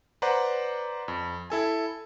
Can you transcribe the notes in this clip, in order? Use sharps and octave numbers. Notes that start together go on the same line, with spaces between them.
B4 C5 D5 F#5 A#5 D6
F2
E4 A4 G#5